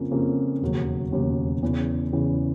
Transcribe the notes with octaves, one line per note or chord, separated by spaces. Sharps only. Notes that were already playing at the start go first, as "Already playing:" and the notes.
Already playing: F2 C#3 F3 A#3 C#4
F2 C#3 F3 A#3 C#4
E1 D#2 C#3 F#3
E1 D#2 C#3 F#3
E2 C#3 E3
E2 C#3 E3